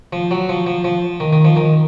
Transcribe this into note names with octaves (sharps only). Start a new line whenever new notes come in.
F3
F#3
F3
F3
F3
D#3
D#3
F3
D#3